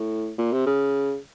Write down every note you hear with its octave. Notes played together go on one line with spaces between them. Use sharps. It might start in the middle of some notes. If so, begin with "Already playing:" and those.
Already playing: A2
A#2
C3
C#3